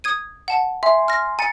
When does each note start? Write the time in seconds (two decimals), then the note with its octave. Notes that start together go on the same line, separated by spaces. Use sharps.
0.04 D#6 G#6 D#7
0.48 F#5 A5
0.83 E5 G#5 C6
1.08 F6 A#6
1.39 G#5 A#5 A6 C#7